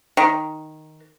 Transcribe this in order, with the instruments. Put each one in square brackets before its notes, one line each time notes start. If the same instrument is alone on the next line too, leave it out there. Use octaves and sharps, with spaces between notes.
[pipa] D#3